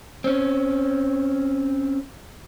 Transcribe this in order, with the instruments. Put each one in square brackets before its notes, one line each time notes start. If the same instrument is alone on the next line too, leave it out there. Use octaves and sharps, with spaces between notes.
[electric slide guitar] C4 C#4